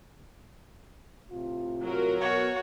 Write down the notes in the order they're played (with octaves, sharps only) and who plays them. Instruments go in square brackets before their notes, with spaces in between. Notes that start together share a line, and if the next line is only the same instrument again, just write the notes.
[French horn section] A2 C3 F4
[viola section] F#3 A#4
[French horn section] B2 [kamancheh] F#4 C#5